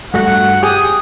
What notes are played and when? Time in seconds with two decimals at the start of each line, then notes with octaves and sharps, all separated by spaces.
0.14 G2 A3 F#4 F#5
0.63 G4 G#4 D#6